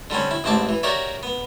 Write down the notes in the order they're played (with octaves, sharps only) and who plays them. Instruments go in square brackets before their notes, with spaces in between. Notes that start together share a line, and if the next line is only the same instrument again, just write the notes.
[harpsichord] D3 G3 C4 C#4
E4
A1 G#2 C4 E4 A5 D6
E3
F#4 G4 A#4 C#5 D5 E5
B3